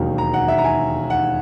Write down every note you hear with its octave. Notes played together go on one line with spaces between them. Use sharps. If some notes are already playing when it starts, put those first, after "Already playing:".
Already playing: E1 D#2 D#3 F#3
A#5
F#5
E5
A#5
G#5
F#5